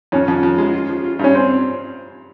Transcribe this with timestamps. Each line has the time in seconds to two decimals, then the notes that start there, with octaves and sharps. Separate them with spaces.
0.12 F2 C#4
0.28 F2
0.43 F2
0.58 G#3
0.73 F4
0.89 F3
1.04 F4
1.19 G2 C#4
1.35 C4